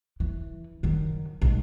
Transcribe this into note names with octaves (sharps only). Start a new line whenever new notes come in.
E3
F#2 D#3
B1 G#3